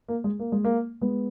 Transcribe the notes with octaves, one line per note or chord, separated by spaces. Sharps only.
A#3
G#3
A#3
G#3
A#3
G#3 B3